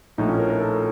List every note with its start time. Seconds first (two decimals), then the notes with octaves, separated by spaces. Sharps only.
0.18 A#1 A2 F3 D#4
0.29 C#4
0.39 A#4
0.50 A#4
0.60 A4